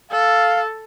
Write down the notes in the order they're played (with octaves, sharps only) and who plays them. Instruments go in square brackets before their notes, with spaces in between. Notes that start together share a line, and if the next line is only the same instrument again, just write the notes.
[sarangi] A4 [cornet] F5